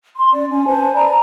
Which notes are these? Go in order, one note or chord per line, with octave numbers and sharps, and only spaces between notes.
C6
C#4 D5
C#4 G#5
B4 C5 G#5 A5
D5 G#5 A#5 B5